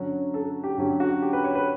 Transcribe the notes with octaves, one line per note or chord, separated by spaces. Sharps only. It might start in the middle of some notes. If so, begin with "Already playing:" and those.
Already playing: D3 F#3 C#4 F#4
A4
G4
D3 F#3 C#4 G4
F#4
G4
B4
C#5
B4